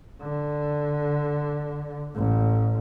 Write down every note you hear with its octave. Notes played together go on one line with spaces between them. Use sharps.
D3
A1